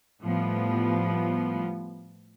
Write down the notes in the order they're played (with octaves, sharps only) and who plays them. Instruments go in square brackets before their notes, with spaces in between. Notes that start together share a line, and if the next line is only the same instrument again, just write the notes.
[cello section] A2 F3 G3 B3